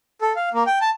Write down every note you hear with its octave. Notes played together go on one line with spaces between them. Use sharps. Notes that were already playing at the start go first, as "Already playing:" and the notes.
A4
F5
A#3
G5
A5